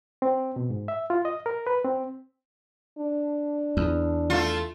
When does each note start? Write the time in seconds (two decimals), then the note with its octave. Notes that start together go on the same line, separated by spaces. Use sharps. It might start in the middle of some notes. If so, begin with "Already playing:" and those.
0.22 C4
0.56 B2
0.70 G#2
0.88 E5
1.10 F4
1.25 D#5
1.46 A#4
1.67 B4
1.85 C4
2.98 D4
3.77 E2
4.30 A3 F4